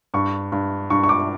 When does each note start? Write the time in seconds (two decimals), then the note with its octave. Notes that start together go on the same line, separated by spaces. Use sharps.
0.14 G2 C#6
0.52 G2
0.90 G2 C#6
1.04 C#6
1.09 D6